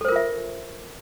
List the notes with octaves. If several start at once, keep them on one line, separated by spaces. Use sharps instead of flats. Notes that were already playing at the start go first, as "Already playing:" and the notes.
F4 A4 A#4 C5 E5